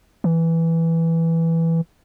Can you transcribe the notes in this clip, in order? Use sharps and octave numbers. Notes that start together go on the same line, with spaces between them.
E3